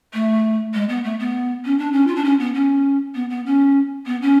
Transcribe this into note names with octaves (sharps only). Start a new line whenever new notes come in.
A3
G#3
B3
A3
B3
C#4
D4
C#4
F4
D4
C#4
B3
C#4
B3
B3
C#4
B3
C#4